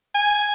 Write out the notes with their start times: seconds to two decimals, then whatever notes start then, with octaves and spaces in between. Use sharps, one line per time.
0.15 G#5